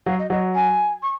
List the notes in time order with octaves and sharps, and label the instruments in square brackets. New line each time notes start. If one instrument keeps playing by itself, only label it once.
[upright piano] F#3 [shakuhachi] F5
[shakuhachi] D#5
[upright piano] F#3 [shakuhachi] D#5
[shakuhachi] G#5
C#6